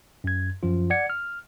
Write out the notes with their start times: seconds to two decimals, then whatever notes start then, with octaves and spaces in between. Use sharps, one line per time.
0.24 F#2 G#6
0.63 F#2 F3 F4
0.90 D5 F#5 G#6 C#7
1.10 F6